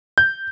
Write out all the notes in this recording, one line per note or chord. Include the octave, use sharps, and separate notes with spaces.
G6